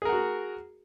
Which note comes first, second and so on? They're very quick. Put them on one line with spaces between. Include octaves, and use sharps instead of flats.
G#4 A#4 F#5 F#4